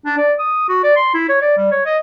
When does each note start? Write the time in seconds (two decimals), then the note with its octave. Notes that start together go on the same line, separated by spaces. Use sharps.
0.06 D4
0.17 D5
0.39 D#6
0.69 F#4
0.83 D5
0.96 C6
1.14 E4
1.29 C#5
1.41 D5
1.57 G3
1.71 C#5
1.86 D#5